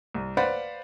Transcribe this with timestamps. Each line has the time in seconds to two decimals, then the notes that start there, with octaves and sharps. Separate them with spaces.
0.15 C2
0.37 B4 C5 D5 F5 F#5 B5